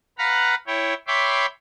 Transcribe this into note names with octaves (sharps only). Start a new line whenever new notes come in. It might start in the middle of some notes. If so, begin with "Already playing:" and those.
B4 F5 F#5 A#5 B5
E4 C#5 G5
C#5 E5 G5 B5 C6 D6